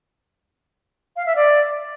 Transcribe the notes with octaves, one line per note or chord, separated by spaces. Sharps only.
F5
E5
D5